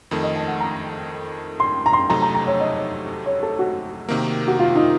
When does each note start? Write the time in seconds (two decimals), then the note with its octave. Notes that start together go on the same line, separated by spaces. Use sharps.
0.11 F2 D#3 A3
0.23 D#5
0.36 A5
0.48 F#5
0.60 A#5
1.60 C6
1.86 A#5
1.93 C6
2.10 F2 C3 F#3 A3 D#4 A#5
2.22 A#5
2.34 A#5
2.47 C#5
2.60 D#5
3.26 C#5
3.43 A4
3.59 F#4
4.09 C3 D#3 A#3
4.48 F#4
4.59 F4
4.76 D#4